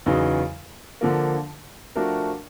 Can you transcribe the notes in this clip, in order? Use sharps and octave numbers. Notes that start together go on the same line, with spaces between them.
E2 C#3 F#3 B3 D#4
D3 F3 A#3
F3 A3 D4 F#4 A#4